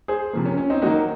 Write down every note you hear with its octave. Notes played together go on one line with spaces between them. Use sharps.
G#4 C5
C3 F3 A#3
C#4
C#4
C4 D#4
D#3 F#3 A#3 D#4 F#4